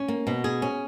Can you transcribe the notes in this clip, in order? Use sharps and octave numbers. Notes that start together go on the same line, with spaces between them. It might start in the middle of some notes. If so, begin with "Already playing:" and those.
Already playing: C#4
A#3
B2
G#4
C#4